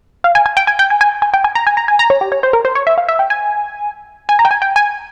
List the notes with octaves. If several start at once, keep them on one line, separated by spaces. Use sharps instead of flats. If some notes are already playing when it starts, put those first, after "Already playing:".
F5
G#5
G#5
G5
G#5
G5
G#5
G#5
G#5
G5
G#5
A#5
G#5
A#5
G#5
A#5
C#5
G4
C#5
C5
A#4
C5
C#5
E5
F5
E5
G5
G#5
G#5
A#5
G5
G#5
G5
G#5